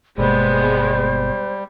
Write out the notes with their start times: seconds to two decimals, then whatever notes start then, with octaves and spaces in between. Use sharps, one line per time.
0.18 G1 B2 G3 G#3 A#3 B3 C5